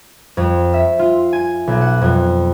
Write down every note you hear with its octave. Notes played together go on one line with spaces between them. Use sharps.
F2
E5
F4
G#5
B1
F#5
F2